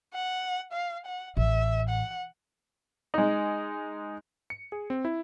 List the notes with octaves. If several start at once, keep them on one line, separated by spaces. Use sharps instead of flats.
F#5
F5
F#5
A1 E5
F#5
G#3 D#4
C#7
G#4
C4
E4